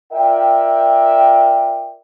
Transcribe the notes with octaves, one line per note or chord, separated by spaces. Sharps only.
F4 A#4 D5 E5 G5